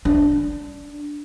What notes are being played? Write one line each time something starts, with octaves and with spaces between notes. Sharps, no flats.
D4